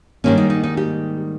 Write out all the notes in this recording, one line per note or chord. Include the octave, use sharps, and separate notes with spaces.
G#2 D#3 G3 A#3 C#4
D#4
D#4
D#4
G4